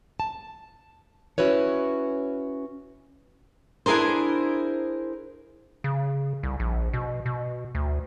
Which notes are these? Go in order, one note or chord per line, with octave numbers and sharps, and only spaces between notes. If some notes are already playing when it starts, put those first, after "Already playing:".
A5
C#4 E4 F#4 B4 C#5
D4 E4 G#4 A#4 C5
C#3
C2
A#1
B2
B2
D2